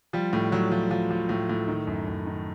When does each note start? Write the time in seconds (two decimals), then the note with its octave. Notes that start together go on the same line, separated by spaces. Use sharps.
0.13 F3 G3
0.33 A2
0.52 A2 F#3
0.71 F3
0.91 F3
1.10 F3
1.29 A2
1.49 A2
1.68 D#3
1.87 F#2
2.06 F#2
2.26 D#3